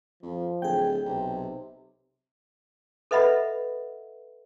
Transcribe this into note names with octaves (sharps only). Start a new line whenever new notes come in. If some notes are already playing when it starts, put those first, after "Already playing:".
F2 F3
D1 G#4 G5
B1 C3
A4 B4 D#5 E5 F#5 B5